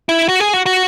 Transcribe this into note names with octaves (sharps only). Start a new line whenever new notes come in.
E4
F#4
G#4
F#4
F#4